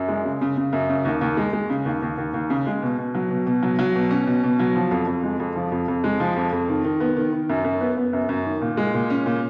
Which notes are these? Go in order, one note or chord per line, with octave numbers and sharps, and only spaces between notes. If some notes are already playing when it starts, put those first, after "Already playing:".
Already playing: F#2
G#3
C#3
C#3
C#3
F#2
C#3
D#2
D#2
G#3
G#3
C#3
D#2
D#2
D#2
D#2
C#3
G#3
B2
B2
F#3
B2
B2
F#3
F#3
B2
C#4
B2
B2
F#3
F3
F2
F2
G#3
F2
F3
F2
F2
G#3
F3
F2
F2
D#3
D#3
B3
D#3
D#3
F#2
F#2
B3
B3
F#2
F#2
D#3
A#2
G#3
A#2
C#4
A#2